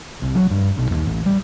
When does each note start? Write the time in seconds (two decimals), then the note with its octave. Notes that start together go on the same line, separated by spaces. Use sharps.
0.22 C2
0.35 F#3
0.50 G2
0.77 B1
0.91 D#2
1.06 A1
1.26 G3